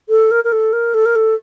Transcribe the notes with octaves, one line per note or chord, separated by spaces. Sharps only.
A4
A#4
A#4
A4
A#4
A4
A#4
A4